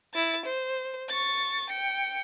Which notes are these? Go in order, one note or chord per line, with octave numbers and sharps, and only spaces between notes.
E4 A6
C5
C#6 A6
G5 C#7